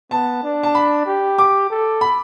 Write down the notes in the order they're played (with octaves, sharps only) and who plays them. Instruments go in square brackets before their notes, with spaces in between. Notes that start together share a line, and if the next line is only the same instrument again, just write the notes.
[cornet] B3 [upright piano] A5
[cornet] D4
[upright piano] A5
B5
[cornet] G4
[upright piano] D6
[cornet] A4
[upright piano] B5